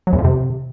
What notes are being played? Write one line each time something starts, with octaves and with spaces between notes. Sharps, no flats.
F#3
E2
F2
C3